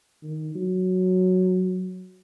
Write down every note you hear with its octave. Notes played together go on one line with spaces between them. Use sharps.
D#3
F#3